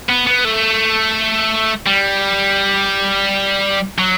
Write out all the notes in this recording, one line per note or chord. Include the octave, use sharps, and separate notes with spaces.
B3
B3
A3
G3
F#3